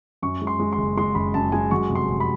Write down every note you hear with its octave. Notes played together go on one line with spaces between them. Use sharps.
F#2 C#6
G#3
C6
G#3
C6
F#1
G#3 C6
F#1 B5
F#2 A5
G#3 G#5
F#3 C#6
F1
C6
F1
B5